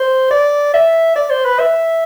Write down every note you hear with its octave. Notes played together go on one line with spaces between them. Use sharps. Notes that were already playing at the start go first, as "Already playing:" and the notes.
Already playing: C5
D5
E5
D5
C5
B4
E5